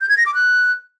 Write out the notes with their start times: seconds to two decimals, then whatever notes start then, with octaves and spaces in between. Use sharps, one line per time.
0.01 G6
0.09 G#6
0.18 A#6
0.26 D6
0.35 F#6